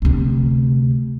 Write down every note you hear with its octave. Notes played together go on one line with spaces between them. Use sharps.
D2 C3